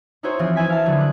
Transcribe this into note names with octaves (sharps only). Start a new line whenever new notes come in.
D#4 E4 F#4 G#4 C5 C#5
E3 F3 C4 F4 G#4
E4 G#4 E5 G#5 B6
F5 A5
D3 F#3 F4 F#4 G#4
D6 F#6